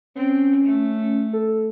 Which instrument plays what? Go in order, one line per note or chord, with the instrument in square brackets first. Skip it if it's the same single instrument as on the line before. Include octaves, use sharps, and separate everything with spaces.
[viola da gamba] C4 [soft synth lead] C#4
[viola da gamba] A3
[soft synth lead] A4